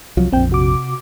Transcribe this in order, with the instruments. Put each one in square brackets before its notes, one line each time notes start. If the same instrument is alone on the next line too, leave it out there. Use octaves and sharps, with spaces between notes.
[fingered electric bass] C2 F3 F#3
[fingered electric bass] A#1 F2 [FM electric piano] C4 G5
[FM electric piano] C3 F#4 D6